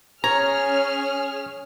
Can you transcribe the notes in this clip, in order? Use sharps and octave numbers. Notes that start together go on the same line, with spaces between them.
C#4 G#4 C#5 A#5 F6